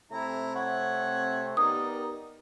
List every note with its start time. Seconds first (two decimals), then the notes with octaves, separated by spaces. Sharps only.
0.11 C3 A3 C4 E4 A#5
0.55 C#5 F#5
1.57 B3 D#4 G4 A#4 D5 D#6